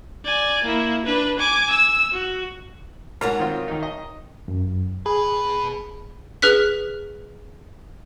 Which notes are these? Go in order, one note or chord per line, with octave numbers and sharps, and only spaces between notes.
D5 G#5
A#3 E4
D4 B4
G#5 D6
E6
F#4
G#2 F#4 A#4 C#5
D#3 C4 F4
D#3 D#4
D#5
F#2
B2 G#4 B4
G#4 B4 F6 F#6 B6